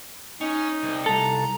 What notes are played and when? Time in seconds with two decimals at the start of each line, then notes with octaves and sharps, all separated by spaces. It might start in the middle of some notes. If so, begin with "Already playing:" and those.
0.41 C#4 D#4
0.83 C2
1.06 C2 A4 A#5